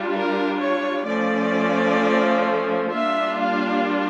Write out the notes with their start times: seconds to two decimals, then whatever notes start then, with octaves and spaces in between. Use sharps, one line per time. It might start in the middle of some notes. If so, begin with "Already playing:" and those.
Already playing: G3 D4 F4
0.14 A#4
0.61 C#5
1.07 F3 A3 C#4 D5
2.94 G3 A#3 D4 F4 E5
3.41 F5